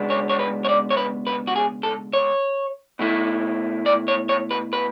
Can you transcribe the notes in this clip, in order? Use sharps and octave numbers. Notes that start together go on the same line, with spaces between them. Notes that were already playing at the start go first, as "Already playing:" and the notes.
Already playing: C#2 B2 G#3 B3 D4
C#5
C#5
B4
C#5
D5
C#5
B4
B4
F#4
G#4
A4
C#5
B2 A3 E4
D5
C#5
C#5
B4
B4